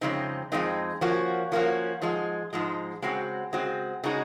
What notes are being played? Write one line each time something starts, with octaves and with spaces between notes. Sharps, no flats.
F2 C#3 G#3 C4 D#4
F2 C#3 G#3 C4 D#4
F3 A#3 C#4 F#4
F3 A#3 C#4 F#4
G#2 F3 G#3
G#2 F3 G#3
C#3 G#3 C4 F#4
C#3 G#3 C4 F#4
C#3 G#3 D#4 F#4